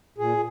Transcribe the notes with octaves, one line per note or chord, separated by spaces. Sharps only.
A#2 G#4